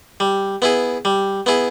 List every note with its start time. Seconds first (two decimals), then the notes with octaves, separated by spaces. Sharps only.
0.20 G3
0.62 B3 E4 G#4
1.05 G3
1.46 B3 E4 G#4